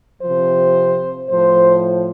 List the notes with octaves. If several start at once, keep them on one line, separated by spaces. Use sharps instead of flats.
C3 F3 C5
A2 F3 C5